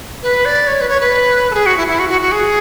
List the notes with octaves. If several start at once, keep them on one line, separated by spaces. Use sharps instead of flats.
B4
D5
C#5
B4
C#5
B4
A4
G#4
F#4
E4
E4
F#4
F#4
F#4
G#4